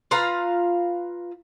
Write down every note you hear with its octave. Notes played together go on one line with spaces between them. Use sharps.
F4 B4 F5 A#5